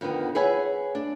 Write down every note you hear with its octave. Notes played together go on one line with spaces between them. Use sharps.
F2 D3 D#3 B3
G#4 B4 C#5 E5 F#5 G#5
D4